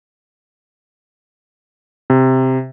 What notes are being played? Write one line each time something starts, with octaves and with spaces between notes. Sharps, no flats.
C3